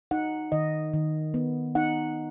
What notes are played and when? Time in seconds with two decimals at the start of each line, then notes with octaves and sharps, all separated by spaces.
0.11 D#4 F#5
0.52 D#3 D#5
0.93 D#3
1.34 B3
1.75 D#4 F#5